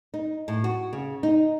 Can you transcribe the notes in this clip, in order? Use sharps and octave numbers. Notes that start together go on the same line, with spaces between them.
D#4
A2
F#4
C#3
D#4